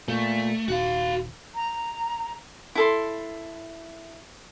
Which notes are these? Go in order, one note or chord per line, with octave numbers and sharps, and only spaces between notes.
A#2 A3
D#1 F#4 F5
A#5
E4 A4 C6